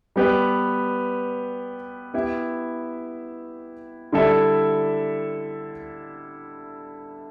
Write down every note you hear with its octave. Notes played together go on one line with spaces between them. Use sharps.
G3 B3 G4 B4
B3 E4 G4 E5
D3 G3 E4 A4 E5